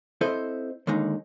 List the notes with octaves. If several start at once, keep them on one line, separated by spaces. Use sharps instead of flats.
C4 E4 A4 C5 D#5
D#2 D3 G#3 D#4